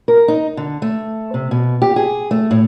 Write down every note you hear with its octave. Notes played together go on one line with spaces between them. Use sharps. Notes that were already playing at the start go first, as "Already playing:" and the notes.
A#4
D#4
D3
A3
C3
B2
G4
G#4
A3
A2